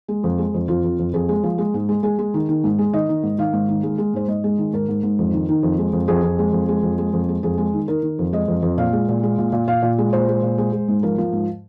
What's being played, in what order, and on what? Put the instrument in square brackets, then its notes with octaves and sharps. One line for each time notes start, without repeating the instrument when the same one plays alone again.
[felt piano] G#3
F2
G#3
F2
F2 F4
F2
F2
F2 G#4
G#3
F3
G#3
G#2
G#3
G#3 G#4
G#3
D#3
D#3
G#2
G#3
D#3 D#5
D#3
G#2
D#3 F5
G#2
D#3
G#3
G#3
G#2 C5
G#2 D#5
G#3
D#3
G#2 A#4
G#2
G#2
F2
D#3
D#3
F2
G#3
F2
F2 G#4
F2
G#3
F2
G#3
F2
G#3
F2
G#3
F2 G#4
G#3
D#3
D#3 A#4
D#3
F2
G#3 D#5
F2
F2
A#2 F5
G#3
A#2
G#3
A#2
A#2
A#2 F5
A#2
G#3
A#2 C5
G#3
A#2
G#3
G#3
G#2
F3 A#4
F3
G#2